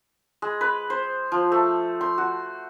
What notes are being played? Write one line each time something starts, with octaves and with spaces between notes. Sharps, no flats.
G#3
B4
C5
F3
A3
C6
F#4